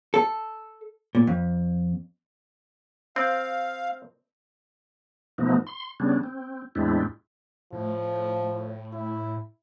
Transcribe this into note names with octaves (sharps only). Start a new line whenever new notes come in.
A4
A#2
F2
C4 F5
B2 F3 A3 B3 D#4
C6
C#3 G3 B3 C#4 D4
C4
E2 A2 G#3 C4 D4 E4
A2 F3
E4